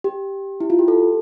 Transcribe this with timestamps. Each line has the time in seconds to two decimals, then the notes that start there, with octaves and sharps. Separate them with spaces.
0.04 G4
0.61 E4
0.70 F4
0.79 G4
0.88 A4